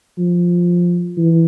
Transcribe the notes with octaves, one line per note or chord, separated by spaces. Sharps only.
F3
E3